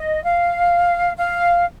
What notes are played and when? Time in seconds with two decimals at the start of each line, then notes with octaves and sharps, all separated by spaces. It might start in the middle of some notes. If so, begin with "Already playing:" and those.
Already playing: D#5
0.24 F5
1.16 F5